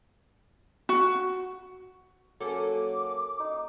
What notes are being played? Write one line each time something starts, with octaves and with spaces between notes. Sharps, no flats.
F#4
F#3 A#3 C#4 A4 D6
D#4